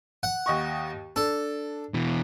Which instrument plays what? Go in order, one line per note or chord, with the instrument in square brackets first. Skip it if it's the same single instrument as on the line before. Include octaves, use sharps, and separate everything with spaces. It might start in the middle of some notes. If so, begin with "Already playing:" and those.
[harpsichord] F#5
[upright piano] D#2 D#5 C#6
[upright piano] D4 [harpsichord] A4
[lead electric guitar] B2 E3